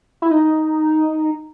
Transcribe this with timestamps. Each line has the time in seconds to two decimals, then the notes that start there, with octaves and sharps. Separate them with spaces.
0.22 E4
0.31 D#4